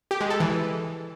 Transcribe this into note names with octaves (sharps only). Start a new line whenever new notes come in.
G4
G#3
A4
E3